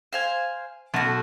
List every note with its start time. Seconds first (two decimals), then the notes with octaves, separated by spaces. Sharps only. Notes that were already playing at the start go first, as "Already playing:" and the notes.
0.13 C5 F5 G#5
0.94 B1 A3 F#4 F#5